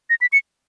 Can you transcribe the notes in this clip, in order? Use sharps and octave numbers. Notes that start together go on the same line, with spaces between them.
A#6
B6
C#7